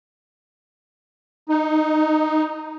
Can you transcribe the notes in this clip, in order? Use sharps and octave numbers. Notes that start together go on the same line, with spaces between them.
D#4